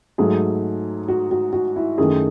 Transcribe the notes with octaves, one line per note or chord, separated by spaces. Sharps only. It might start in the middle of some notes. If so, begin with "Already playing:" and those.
G#2 F#3 A3 G#4
F#4
F#4
F#4
E4
F#2 D#3 A3 G#4